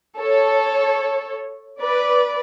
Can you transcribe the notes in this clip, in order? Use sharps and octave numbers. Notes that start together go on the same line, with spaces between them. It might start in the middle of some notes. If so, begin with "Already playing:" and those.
A4 C#5
B4 D5